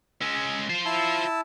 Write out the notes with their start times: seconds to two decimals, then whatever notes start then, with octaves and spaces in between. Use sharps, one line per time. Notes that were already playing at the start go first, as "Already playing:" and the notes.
0.21 G#3 C#4 E6
0.70 F4 C5
0.86 E4 A5 E6